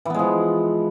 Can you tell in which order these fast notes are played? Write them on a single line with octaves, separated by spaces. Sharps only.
E3 B3 G#3 F3